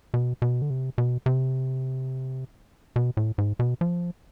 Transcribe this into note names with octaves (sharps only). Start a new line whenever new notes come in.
B2
B2
D3
C3
B2
C3
B2
A2
G#2
B2
F3